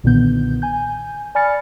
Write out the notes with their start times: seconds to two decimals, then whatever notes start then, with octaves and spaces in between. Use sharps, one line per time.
0.03 B1 A#2 D3 D#3 B3 G6
0.62 G#5 G6
1.35 D5 G#5 B5 F6 A6 C#7